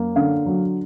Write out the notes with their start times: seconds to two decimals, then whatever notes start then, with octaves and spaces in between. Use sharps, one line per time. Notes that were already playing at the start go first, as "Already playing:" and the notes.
Already playing: F#2 A#3
0.16 D3 F5
0.46 F#3